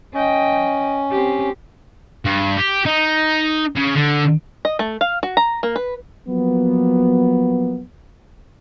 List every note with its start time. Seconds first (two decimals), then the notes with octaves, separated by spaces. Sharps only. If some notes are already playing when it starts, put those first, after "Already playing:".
0.14 C#4 D#5 G5
1.11 C4 G4
2.25 G2
2.57 G4
2.85 D#4
3.76 C#3
3.95 D3
4.65 D#5
4.79 A3
5.01 F5
5.23 F#4
5.37 A#5
5.63 A#3
5.76 B4
6.28 F3 F#3 A#3 B3